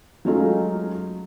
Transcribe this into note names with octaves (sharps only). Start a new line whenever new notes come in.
F#3 G#3 A3 C#4 D#4 F4